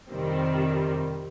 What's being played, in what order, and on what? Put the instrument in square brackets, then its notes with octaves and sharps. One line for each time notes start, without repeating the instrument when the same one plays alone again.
[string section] F2 C3 D#3 G3 C4